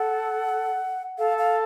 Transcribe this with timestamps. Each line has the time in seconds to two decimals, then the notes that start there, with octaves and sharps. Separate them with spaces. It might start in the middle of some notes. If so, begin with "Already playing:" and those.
Already playing: A4 F#5
1.18 A4 F5
1.38 F5